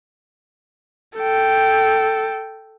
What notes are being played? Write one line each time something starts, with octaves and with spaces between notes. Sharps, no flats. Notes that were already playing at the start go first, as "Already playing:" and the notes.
A4 G5